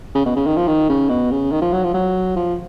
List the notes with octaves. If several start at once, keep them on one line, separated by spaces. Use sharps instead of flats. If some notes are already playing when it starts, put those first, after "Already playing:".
C#3
B2
C#3
D#3
F3
D#3
C#3
B2
C#3
D#3
F3
F#3
F3
F#3
F3